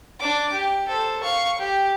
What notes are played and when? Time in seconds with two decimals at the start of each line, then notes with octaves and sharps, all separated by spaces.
0.20 D4 D6
0.52 G4
0.88 A4 C5
1.21 F5 C#6
1.58 G4